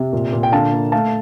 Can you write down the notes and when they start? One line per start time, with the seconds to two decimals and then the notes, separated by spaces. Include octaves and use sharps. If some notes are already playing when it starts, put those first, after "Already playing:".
Already playing: C3
0.13 A#2
0.33 A#2
0.43 G5
0.52 D3 F5 A5
0.73 A#3
0.92 A3 F5 A5